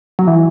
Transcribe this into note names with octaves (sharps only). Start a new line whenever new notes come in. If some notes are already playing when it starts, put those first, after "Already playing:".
F#3
E3